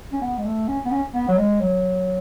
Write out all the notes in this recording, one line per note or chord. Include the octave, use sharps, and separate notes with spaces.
C#4
B3
G#3
A3
C#4
B3
C#4
B3
F#3
G#3
F#3